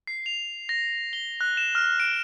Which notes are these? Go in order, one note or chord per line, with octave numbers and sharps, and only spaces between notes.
C7
F7
A#6
G7
F#6
E7
F6
D7